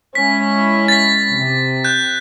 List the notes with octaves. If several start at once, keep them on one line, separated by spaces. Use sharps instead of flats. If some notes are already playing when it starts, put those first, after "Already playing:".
G#3 C#4 E4 B6
A6 B6
C3
F#6 G6